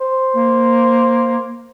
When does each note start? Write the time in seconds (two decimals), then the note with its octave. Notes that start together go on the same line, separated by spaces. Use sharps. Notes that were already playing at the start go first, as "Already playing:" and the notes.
0.01 C5
0.34 A#3